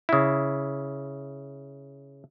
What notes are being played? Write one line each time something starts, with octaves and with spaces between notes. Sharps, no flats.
C#3 E4